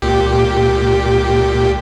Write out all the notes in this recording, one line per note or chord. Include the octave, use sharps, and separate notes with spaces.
C#2 A#2 G4